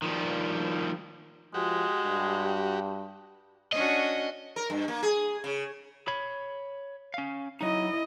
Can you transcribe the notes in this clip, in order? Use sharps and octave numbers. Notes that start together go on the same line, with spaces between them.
D#3 F3 G3
F3 G#3 F#4 G4
G2
C#4 D4 F#4 D#5
A#4
G2
A#3
G#4
C#3
C#5 B5
C#4 F5
F#3 D#4 E4 D#5